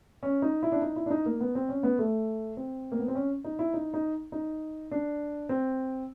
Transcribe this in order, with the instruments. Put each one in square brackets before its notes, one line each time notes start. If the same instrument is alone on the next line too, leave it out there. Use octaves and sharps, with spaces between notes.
[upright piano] C#4
D#4
E4
D4
D#4
E4
D4
D#4
A#3
B3
C4
C#4
B3
A3
C4
A#3
B3
C4
C#4
D#4
E4
D#4
D#4
D#4
D4
C4